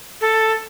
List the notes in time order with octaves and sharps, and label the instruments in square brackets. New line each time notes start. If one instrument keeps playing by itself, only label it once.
[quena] A4